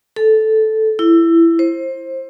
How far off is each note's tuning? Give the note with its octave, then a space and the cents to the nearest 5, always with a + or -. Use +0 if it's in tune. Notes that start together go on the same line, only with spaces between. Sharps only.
A4 -10
E4 +15
C5 +20